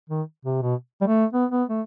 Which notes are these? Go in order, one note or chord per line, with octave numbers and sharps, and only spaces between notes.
D#3
C3
B2
G3
A3
B3
B3
A3